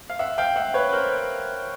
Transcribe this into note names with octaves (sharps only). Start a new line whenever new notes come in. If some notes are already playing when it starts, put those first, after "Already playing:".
F5
E5 F#5
F5 G5
E5 F#5
B4 C#5
B4
A#4 C5